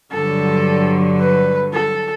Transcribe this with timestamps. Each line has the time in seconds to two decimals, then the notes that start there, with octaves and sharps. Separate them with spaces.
0.12 G2 D3 F#3 A4
1.20 B4
1.73 A4